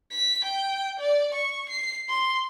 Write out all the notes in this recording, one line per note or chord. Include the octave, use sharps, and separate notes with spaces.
B6
G5
D5
C#6
C7
C6